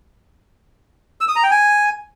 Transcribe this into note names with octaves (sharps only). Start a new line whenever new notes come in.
E6
D#6
A#5
G5
G#5